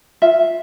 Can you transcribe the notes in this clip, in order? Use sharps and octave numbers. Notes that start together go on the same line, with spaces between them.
F4 E5